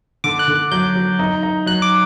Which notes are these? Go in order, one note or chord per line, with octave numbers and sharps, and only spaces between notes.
D3 D6
F#6
D3
F#6
F#3 G6
F#3
D#4
D#4
F#3 F#6
D6